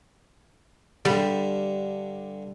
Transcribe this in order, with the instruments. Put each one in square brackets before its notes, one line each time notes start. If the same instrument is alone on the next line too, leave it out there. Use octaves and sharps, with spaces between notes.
[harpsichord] G2 D3 [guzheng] G3